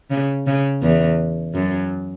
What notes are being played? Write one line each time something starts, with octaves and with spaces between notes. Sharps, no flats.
C#3
C#3
E2
F#2